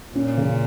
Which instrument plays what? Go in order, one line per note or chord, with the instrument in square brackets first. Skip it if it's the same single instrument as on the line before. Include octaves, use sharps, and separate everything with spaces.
[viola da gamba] A#2 [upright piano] C#4
[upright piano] C#3